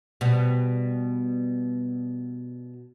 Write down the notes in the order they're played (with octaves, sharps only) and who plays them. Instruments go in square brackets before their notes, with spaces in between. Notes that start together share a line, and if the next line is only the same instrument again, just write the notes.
[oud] B2 G3